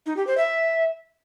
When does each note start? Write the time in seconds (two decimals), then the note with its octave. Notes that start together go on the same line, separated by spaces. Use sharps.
0.06 D#4
0.17 G4
0.27 C5
0.37 E5